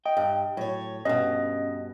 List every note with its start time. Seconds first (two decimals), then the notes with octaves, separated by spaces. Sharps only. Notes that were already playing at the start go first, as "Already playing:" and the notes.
0.05 D#5 G5
0.17 G2
0.57 A2 F#3 C#5
1.05 G2 B2 C#4 D#5